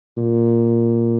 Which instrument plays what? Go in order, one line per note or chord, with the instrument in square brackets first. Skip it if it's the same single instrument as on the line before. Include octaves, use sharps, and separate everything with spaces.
[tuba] A#2